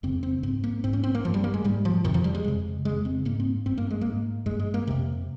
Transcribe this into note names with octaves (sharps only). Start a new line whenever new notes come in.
F2 C#3 C4
C4
G#2 C4
A#3
G#2 C4
C#4
C4
A#3
G2 F3
G3
A#3
G#3
G#2 G3
F3
F2 C3 D#3
F3
G3
G#3
F2 C#3
F2 C#3 G#3
C4
G#2 A#3
C4
G2 C4
A#3
G#3
G#2 A#3
G2 G#3
G#3
A#3
F2 C3